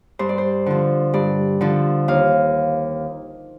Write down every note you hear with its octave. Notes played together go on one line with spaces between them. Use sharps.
G2 C5
D5
C5
D3 F3
G2 D5
D3 F3
D#2 F5